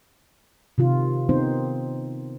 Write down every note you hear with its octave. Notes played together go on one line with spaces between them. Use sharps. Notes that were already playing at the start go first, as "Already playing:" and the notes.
C3 D#3 F4
D#3 B3 C4 D#4 C5